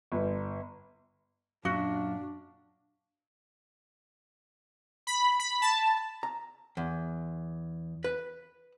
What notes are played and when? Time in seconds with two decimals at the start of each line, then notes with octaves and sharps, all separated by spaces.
0.12 G1
1.65 F#2 A#2 D4 F#4 F5
5.07 B5
5.40 B5
5.62 A5
6.23 A#5
6.77 E2
8.04 B4